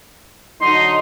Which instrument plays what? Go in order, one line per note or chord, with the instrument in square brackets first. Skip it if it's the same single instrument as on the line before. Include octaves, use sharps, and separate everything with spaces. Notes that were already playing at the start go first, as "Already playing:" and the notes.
[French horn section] D3 F#3 D#4 [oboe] C6